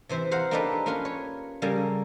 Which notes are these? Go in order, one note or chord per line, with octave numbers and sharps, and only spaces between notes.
C3 E3 C5 E5
C5 F5 F#5 A#5
A#3 D4 D#4 G4 A4 B4
A#3 C#4 F4 A#4 B4
C#5
C#3 G3 A#3 A4 G#5